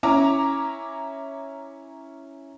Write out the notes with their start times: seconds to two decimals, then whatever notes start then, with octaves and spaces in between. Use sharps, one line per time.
0.03 C#4 E4 A#5 D6